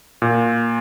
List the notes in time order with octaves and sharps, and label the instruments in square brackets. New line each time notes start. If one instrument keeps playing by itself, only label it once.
[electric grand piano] A#2